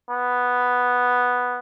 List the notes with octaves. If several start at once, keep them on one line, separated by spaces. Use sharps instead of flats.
B3